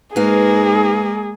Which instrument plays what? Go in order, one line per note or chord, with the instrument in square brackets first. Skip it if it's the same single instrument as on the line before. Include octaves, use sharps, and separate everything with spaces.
[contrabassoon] G#2 [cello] G#3 A#3 [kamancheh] G#4 [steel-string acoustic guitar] B4 F5